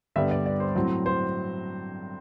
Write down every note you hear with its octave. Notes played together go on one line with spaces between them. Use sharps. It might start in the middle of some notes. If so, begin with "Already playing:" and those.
G2 D3 G3 B3 E5
D5
D5
C5
A2 F#3 C4
C5